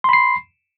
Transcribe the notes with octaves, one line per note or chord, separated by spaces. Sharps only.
B5 C6 C7